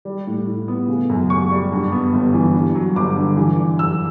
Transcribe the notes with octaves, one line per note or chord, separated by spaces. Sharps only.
G3
A2
A2
B3
C#3
F#2
F#2 C#6
G3
G2
B3
G1
E3
G2
F#3
G1 D6
D3
E3
D4
F#2 E6